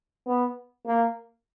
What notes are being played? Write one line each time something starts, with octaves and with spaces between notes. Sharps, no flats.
B3
A#3